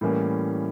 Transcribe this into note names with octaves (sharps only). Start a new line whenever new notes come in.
A2 E3 G3 A#3 C#4